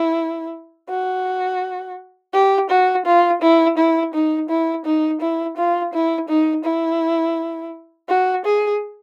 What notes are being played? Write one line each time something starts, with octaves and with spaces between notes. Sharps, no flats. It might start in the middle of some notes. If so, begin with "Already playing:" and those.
Already playing: E4
F#4
G4
F#4
F4
E4
E4
D#4
E4
D#4
E4
F4
E4
D#4
E4
F#4
G#4